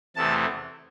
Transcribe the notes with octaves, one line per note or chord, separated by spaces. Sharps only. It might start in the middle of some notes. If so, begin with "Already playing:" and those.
E2 C3 E3 A3 A5